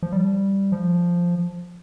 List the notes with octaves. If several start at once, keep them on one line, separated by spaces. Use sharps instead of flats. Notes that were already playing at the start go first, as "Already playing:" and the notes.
F3
G3
F3